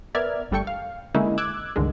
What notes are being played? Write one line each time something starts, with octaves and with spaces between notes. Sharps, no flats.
B3 A#4 D5 E5 F6 G#6
G1 G3 A3 G5 C#6
F5
D3 G#3 A#3 C#4 D#4 E4
D6 E6 F#6 G#6
C#2 G2 D3 D#3 G#3